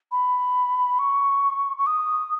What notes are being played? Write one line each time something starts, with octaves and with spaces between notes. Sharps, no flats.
B5
C#6
C#6
D#6